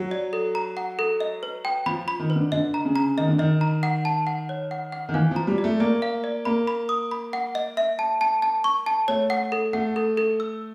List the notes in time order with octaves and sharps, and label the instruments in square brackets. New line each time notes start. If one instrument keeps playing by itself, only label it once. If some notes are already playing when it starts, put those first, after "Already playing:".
Already playing: [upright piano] F#3
[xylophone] D5
A4
A#5
F#5
A4
D#5
B4
G5
[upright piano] F3 [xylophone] B5
[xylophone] B5
[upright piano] D#3
[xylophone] B4
[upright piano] D3
[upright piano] D3 [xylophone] D#5
[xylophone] A#5
[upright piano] C#3
[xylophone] A#5
[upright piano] D#3 [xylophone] D#5
[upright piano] D3
[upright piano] D#3 [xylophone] D#5
[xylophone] A#5
F#5
A5
F#5
C#5
F#5
F#5
[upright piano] D#3
[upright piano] E3 [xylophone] F5
[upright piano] F3
[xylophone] A#5
[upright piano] G3
[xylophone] D5
[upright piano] A3
[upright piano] A#3 [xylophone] D5
[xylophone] F5
D5
[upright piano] A#3 [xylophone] B5
[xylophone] B5
D#6
B5
F#5
D#5
E5
A5
A5
A5
C#6
A5
[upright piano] A3 [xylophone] C#5
[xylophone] F#5
A4
[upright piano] A3 [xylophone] F#5
[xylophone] A4
A4
E6